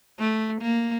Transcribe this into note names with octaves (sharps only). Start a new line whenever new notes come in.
A3
A#3